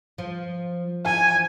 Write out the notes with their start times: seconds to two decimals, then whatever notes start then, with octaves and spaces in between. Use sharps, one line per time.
0.18 F3
1.05 E3 F3 G#5